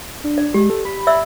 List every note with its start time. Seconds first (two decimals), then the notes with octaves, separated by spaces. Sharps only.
0.24 D4
0.38 D5
0.54 G#3 G4
0.70 A4
0.85 B5
1.07 D5 E5 E6